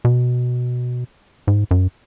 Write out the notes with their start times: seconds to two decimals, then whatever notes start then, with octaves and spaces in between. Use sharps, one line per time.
0.05 B2
1.47 G#2
1.71 F#2